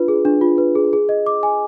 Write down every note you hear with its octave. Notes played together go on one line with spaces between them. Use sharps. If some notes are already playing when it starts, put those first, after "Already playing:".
Already playing: D4 F4 B4
G#4
D4
F4
B4
G#4
G#4
D#5
D6
G#5